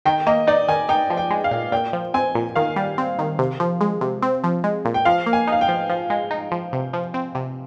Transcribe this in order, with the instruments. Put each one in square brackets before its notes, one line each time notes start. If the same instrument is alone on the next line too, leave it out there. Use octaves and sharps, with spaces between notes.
[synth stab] D#3 [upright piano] G5
[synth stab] A#3 [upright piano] D#5
[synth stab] D#4 [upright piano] D5
[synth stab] D#3 [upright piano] G#5
[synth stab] D#4 [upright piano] G5
[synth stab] F3
[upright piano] G5
[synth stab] G#3
[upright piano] F5
[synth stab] A#2
[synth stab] A#2 [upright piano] G5
[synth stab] F3
[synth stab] C4 [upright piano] G#5
[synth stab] A#2
[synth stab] D#3 [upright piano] F5
[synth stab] G3
C4
D#3
C3
F3
G#3
C3
C4
F3
G#3
A#2
[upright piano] G5
[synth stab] F3 [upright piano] F5
[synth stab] A#3
[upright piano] G#5
[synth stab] D#4
[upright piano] F5
G5
[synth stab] F3
F3
G#3
D#4
F3
C3
F3
C4
C3